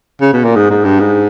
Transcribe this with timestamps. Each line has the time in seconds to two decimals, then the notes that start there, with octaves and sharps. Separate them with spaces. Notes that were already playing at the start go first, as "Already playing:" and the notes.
0.21 C#3
0.33 B2
0.44 A#2
0.56 G#2
0.70 G#2
0.85 G2
1.00 G#2